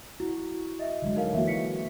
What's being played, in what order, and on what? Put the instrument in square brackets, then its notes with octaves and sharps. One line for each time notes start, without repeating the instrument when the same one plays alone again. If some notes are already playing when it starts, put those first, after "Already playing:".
[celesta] E4 [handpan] F#4
[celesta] D#5 E5
[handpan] D3 F#3 G#3
[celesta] D#4 A#4 F5
[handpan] E3 A#3 F#4 [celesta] E5
[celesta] B6 C#7